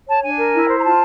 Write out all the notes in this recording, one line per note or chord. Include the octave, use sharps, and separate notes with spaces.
C#5 A5
D4 G#5
A#4
E4
C5
A#5
F4 A5